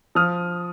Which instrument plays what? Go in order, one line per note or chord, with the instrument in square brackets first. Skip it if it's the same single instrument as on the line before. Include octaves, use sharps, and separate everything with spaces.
[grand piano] F3 D#6 F6